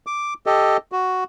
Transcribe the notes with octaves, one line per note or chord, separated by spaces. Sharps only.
D6
G4 A4 D#5
F#4